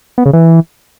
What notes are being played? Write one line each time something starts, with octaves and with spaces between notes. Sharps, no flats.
B3
C#3
E3